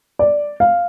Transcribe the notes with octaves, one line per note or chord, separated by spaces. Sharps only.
D5
F5